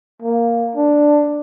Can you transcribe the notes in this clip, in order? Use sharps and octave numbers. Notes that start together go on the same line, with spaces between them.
A#3
D4